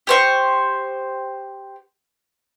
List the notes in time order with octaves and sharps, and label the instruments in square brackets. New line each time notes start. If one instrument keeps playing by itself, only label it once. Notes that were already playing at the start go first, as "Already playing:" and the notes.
[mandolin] G4 C5 C#6